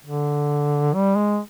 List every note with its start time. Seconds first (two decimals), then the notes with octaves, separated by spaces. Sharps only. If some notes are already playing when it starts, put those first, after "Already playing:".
0.06 D3
0.94 G3
1.16 G#3